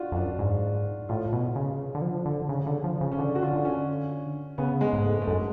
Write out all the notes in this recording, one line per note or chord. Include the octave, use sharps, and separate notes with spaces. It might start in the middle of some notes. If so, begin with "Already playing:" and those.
Already playing: D4 F4 F#4
F2
F#2 D4
G#2
A2 F4
B2
C#3
D3
F3
D3
C#3
D3
F3
C#3
C#4
D3 D4
F#4
F4
D3
C#4
C#3 B3
G#3
G#2
A3
A3
F#2 G#3